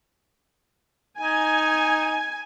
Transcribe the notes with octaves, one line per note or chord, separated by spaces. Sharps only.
D#4 G#5